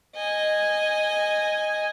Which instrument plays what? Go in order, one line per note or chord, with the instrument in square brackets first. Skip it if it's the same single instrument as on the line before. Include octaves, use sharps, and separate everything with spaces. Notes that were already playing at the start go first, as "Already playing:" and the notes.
[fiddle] D#5 G#5